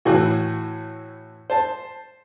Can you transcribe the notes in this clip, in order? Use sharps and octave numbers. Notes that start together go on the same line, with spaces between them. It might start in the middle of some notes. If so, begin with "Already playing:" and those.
A2 E3 F#4
C5 A5